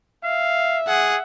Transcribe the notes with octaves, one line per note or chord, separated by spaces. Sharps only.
E5 F5
G#4 F#5